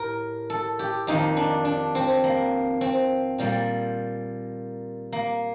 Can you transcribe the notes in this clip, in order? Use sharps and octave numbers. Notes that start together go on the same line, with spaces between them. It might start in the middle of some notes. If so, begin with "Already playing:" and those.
Already playing: A2 G4 A#4
A4
G4
F2 D#3 A#3 D#4
D4
D4
C4
A#3
C4
A#2 G3 A#3
A#3